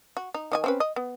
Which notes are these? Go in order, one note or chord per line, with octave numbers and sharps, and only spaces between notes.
F#4
D#4
D#3 D#5 G#5
C4 C#4 B4
D#5
B3